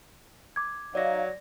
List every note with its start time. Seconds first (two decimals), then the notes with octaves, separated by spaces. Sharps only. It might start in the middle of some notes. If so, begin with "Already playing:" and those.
0.56 D6 G#6
0.95 F#3 D#4 D5 F5 A#6